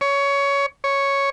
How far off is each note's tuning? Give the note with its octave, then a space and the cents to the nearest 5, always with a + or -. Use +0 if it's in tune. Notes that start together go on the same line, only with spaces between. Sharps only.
C#5 +15
C#5 +0